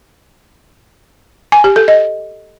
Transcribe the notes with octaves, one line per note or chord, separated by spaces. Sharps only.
G#5
G4
A4
D#5